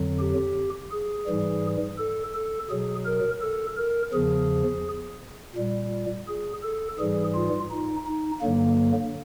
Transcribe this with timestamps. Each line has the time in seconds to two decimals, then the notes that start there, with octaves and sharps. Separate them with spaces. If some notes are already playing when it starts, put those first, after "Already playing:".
Already playing: F2 D3 F#3
0.20 G4
0.91 G#4
1.27 G#2 E3 G3
1.98 A4
2.34 A4
2.70 B2 F#3 G#4
3.05 A#4
3.41 A4
3.77 A#4
4.13 E2 C#3 F3 G#4
5.56 A#2 G3
6.28 G#4
6.63 A4
6.99 G#2 E3 G3 G#4
7.35 F4
7.71 D#4
8.07 D#4
8.42 G2 D3 F#3 A#3